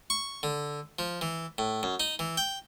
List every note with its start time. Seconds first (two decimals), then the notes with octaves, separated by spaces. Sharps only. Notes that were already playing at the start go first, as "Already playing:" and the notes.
0.10 C#6
0.43 D3
0.99 F3
1.21 E3
1.58 A2
1.83 F#2
2.00 D#4
2.19 E3
2.37 G5